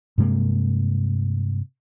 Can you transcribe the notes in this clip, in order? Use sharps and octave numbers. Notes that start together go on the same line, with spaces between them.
G2 C3 G#3 A#3